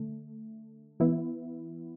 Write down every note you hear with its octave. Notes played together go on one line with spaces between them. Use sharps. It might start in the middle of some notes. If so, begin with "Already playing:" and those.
Already playing: D3 A3
E3 B3 E4